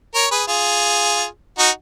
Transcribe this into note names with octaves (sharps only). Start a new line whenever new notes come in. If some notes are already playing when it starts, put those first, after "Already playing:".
A#4 C#5
G#4 B4
F4 G#4
D#4 F#4